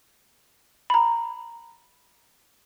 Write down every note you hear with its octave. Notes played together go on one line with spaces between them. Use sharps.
A#5 B5